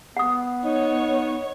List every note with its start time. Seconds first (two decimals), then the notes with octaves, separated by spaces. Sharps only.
0.17 B3 F#5 D#6
0.65 D#4 C#5